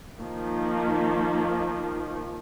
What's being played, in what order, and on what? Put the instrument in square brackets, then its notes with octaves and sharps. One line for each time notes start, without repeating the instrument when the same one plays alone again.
[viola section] D#3 F3 A#3